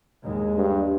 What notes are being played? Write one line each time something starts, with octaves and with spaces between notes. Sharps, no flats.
D#2 G#3
G2